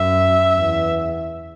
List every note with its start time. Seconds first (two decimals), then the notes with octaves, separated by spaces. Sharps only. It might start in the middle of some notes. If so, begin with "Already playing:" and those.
Already playing: F#2 E5
0.58 E2